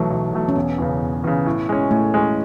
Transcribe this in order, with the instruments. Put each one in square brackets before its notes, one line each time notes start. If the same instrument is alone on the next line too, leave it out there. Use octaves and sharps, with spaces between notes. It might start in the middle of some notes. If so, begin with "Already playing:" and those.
Already playing: [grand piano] B1 B2 F#3 A3 [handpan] E3
[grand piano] B1
B2 F#3 A3
[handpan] C#4
[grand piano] E1 [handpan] B3
[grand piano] E2 C#3
E1
E2 C#3
A2
G#3 C#4
[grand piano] A2 [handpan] A3
[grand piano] G#3 C#4